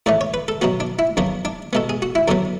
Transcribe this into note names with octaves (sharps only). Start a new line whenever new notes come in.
A2 E3 A3 D5
C#5
B4
A4
B2 F#3 B3 F#4
D4
E4
F#2 C#3 F#3 B3 D4
D4
B2 G#3 B3 A4
G#4
F#4
E4
F#2 D3 F#3 B3 D4